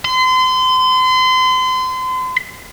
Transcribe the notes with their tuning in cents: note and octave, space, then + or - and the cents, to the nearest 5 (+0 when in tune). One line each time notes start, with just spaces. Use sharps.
C6 -35